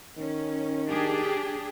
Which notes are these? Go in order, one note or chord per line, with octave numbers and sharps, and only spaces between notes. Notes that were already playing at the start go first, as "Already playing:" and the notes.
D#3 C#4
D4 G4 G#4